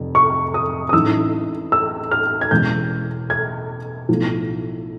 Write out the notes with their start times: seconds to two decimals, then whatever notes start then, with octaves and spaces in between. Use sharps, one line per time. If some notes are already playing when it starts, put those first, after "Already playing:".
Already playing: F1 F2
0.15 C#6
0.54 D#6
0.89 D#6
0.93 A1 G#2 E3 E6
1.72 E6
2.11 F6
2.41 G#6
2.51 E2 B2 G#3 C#4 G6
3.30 G#6
4.09 B1 A2 F3